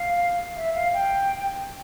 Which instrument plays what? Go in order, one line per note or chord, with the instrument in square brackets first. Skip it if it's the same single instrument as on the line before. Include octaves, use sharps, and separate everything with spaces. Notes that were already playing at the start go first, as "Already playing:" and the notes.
Already playing: [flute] F5
E5
F5
G5